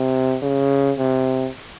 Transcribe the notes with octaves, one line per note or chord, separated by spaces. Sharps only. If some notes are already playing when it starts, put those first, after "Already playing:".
Already playing: C3
C#3
C3